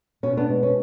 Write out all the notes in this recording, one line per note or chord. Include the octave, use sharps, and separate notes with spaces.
B2 C#4
B3 D4
G#3
C#4